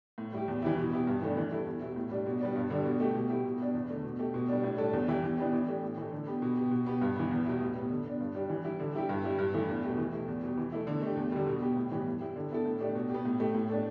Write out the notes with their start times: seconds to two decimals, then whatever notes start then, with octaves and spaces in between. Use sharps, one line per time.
0.18 A2
0.33 G3 E4 G4
0.48 E2
0.62 E3 G3 E4
0.78 B2
0.92 B3 E4 G4
1.07 G2
1.22 E3 A3 D4
1.37 E3
1.51 G3 E4 A4
1.66 E2
1.81 B2 G3 E4
1.96 A2
2.11 G3 D4 G4
2.26 B2
2.40 G3 B3 D4
2.56 G2
2.70 D3 G3 D4
2.85 B2
3.00 A3 G4
3.15 B2
3.30 G3 E4 G4
3.45 B2
3.60 B3 D4
3.74 E2
3.89 D3 A3
4.04 B2
4.19 A3 G4
4.34 B2
4.49 G3 D4
4.64 A2
4.78 G3 D4 A4
4.93 E2
5.08 E3 G3 E4 G4
5.23 E2
5.38 E3 B3 D4 G4
5.53 E3
5.68 A3 D4 G4
5.83 A2
5.97 E3 A3
6.12 D3
6.27 B3 G4
6.42 B2
6.57 B3 G4
6.71 B2
6.86 B3 G4
7.01 G2
7.16 E3 B3
7.31 E2
7.46 B2 G3 E4
7.61 A2
7.75 G3 B3
7.90 D3
8.05 B3 D4
8.20 G2
8.35 G3 D4 G4
8.49 E3
8.65 G3 E4 G4
8.80 D3
8.94 G3 E4 G4
9.09 G2
9.24 G3 E4 G4
9.38 G2
9.54 E3 A3 E4 A4
9.69 E2
9.84 B2 A3 G4
9.98 E3
10.13 A3 E4 G4
10.28 E2
10.43 B2 G3
10.57 E3
10.72 A3 E4
10.87 D3
11.02 A3 G4
11.17 E2
11.32 D3 G3
11.47 B2
11.62 B3 G4
11.76 A2
11.92 E3 G3 B3 G4
12.06 G2
12.21 G3 E4 G4
12.36 D3
12.51 B3 E4 A4
12.65 A2
12.80 A3 D4 G4
12.95 B2
13.10 B3 G4
13.25 A2
13.40 A3 G4
13.54 A2
13.70 A3 D4 A4